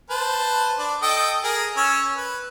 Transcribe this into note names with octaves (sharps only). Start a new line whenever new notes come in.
B4 C5 A5
D4
A4 D#5 G5
G#4 A#4
C#4 C#5 E6
B4